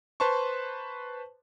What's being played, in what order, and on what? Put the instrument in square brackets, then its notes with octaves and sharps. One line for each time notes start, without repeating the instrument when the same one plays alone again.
[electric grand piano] B4 C5 A5 C6 C#6